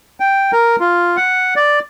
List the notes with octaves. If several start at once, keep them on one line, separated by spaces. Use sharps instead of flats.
G5
A#4
F4
F#5
D5